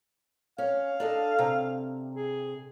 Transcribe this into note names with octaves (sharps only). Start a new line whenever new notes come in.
C#4 F5
D4 A4 D#5
C3
G#4